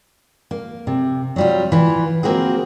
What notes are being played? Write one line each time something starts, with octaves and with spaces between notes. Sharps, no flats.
A#3
C3
F#3 G3 F4
E3 F4
A#3 C4 F4 F#4 G#4